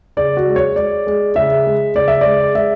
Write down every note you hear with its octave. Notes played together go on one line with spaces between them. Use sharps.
C#3 D5
F#4
G#3
C#5
G#3 D5
G#3
C#3 E5
G#3
C#3 D5
E5
G#3 D5
G#3 E5